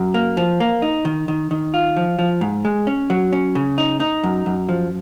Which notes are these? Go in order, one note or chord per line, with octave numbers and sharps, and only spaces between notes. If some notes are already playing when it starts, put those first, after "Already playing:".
Already playing: F#2
A#3
F3
A#3
D#4
D#3
D#3
D#3
F4
F3
F3
G#2
G#3
C#4
F#3
C#4
C#3
D#4
D#4
F#2
F#2
F3